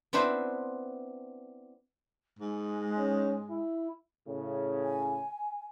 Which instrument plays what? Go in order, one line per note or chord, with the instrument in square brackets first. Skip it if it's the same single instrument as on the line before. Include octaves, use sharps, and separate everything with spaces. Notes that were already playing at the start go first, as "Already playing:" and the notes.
[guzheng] B3 C4 D4 E4 B4 C5
[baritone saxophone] G#2 [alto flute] G#3
[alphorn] C#4
E4
[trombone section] A2 C#3
[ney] G#5